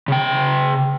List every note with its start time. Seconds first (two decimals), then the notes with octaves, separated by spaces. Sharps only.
0.08 C#3 G5